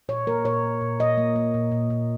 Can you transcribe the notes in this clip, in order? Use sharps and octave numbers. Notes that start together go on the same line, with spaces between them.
A#2 C#5
A#3 A#4
A#2 C#5
A#3
A#2
A#2 D#5
A#3
A#3
A#2
A#2
A#2